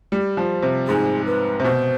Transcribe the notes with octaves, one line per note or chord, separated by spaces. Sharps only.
G3
F3
C3
G#2 G#4
B4
C3
B2 C5